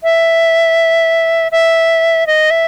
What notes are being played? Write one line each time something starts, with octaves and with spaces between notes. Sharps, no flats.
E5
E5
D#5
E5